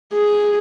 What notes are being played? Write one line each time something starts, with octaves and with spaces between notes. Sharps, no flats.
G#4